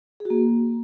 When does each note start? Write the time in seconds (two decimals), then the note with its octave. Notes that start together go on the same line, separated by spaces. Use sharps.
0.20 G#4
0.25 F#4
0.30 A#3